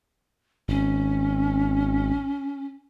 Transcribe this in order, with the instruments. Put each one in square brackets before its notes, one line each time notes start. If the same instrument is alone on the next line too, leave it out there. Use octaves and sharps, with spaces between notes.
[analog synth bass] G#1 [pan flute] C#4